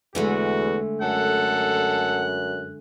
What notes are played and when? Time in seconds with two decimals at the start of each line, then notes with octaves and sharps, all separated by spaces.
0.15 E2 D3 G#3 A3 F#4
1.02 F#2 A4 F#5 F#6